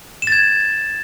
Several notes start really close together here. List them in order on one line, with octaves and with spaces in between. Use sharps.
E7 A6 G#6